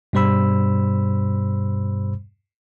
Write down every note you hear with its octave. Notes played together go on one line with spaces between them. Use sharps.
G2 B2 G3 C5 B5 E6